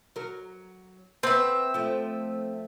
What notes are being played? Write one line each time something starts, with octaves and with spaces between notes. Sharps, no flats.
F#3 A#4
B3 C4 E5
F3 A3